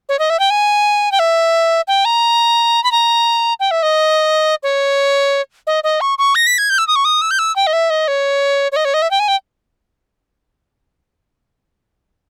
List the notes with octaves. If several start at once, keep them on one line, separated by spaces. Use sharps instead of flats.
C#5
D#5
E5
G5
G#5
G5
E5
G5
A#5
B5
A#5
G5
E5
D#5
C#5
D#5
D#5
C#6
C#6
A#6
B6
G#6
G6
E6
D#6
C#6
D#6
E6
G6
E6
G5
D#5
E5
D#5
C#5
C#5
D#5
C#5
D#5
E5
G5
G#5
G5